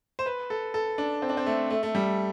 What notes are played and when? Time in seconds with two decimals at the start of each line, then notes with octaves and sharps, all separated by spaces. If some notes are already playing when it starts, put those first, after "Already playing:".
0.19 C5
0.26 B4
0.50 A4
0.74 A4
0.98 D4
1.22 C4
1.30 D4
1.37 C4
1.46 A3
1.70 A3
1.83 A3
1.95 G3